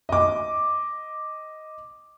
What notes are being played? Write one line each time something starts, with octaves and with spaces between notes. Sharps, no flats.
D#5 D6